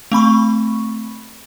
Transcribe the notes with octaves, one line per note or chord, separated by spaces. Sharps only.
A3 C4 B5 C#6